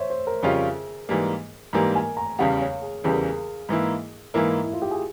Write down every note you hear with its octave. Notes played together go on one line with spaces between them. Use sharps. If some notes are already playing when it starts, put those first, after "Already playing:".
Already playing: C5 C#5 E5
C5
A#4
F2 C#3 G3 C#4 F4 G#4
G#2 E3 G3 A#3
G#2 E3 G3 A#3 A#4
G#5
A#5
E2 C#3 E3 G3 F5
C#5
G#4
E2 C#3 E3 G3 G#4
A#4
G#4
G#2 E3 A#3 E4
G#2 E3 A#3 E4 A#4
E4
F4
G4
G#4